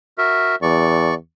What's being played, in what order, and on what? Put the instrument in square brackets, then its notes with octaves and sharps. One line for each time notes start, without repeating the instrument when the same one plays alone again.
[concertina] F#4 A#4 E5
[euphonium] E2 [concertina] D5 C#6